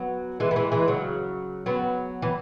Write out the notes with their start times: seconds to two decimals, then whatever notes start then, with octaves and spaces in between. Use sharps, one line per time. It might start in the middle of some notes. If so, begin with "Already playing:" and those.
Already playing: F#3 B3
0.40 E3 G#3
0.51 B3
0.56 E3 G#3
0.72 E3 G#3
0.88 C#3 F#3
1.66 F#3 B3
2.22 E3